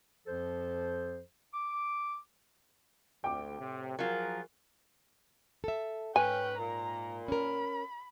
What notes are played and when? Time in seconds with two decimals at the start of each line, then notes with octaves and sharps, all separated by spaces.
0.27 F2 F3 A4 C5
1.54 D6
3.24 D2 G5 D6
3.59 A2 C3
3.99 F3 F#3 F4 G#4 A#4
5.64 A4 E5
6.16 G#2 C#4 B4 G5 G#5
6.58 A#2 A#5
7.28 C#4 A#4 B5